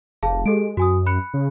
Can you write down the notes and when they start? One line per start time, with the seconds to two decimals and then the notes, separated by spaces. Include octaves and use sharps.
0.23 F1 G#4 F5 A5
0.46 G#3 G4 A4 D7
0.77 F#2 F#4 G#5 D#6
1.06 B5 F#6 C#7
1.34 C#3